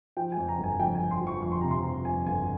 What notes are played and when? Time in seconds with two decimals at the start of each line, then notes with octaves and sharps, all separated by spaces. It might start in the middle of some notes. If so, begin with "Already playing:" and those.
0.17 F3 G5
0.32 G#5
0.37 F2
0.48 A#5
0.58 G1
0.64 G#5
0.80 F2 G5
0.95 G#5
1.01 F2
1.11 C6
1.21 F3
1.27 C#6
1.42 F2 C#6
1.52 C6
1.61 C3 A#5
1.71 C6
1.84 F3
2.05 F2 G#5
2.26 G1 G#5